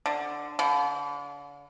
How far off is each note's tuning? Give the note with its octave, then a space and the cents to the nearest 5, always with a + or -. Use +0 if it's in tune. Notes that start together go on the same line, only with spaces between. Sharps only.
D3 +5
D3 -40